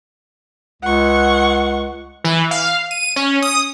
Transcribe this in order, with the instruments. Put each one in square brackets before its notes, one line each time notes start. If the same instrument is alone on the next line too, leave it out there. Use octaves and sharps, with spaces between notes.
[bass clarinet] C#2 [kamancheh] F#5 C#6
[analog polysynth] E3
F5
D#7
C#4
D#6